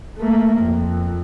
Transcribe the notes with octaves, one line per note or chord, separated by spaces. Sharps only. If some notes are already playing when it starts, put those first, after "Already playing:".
A3 A#3
F2